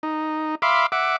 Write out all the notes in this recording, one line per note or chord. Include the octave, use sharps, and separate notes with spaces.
D#4
E5 F5 B5 C6 D6
E5 F#5 D6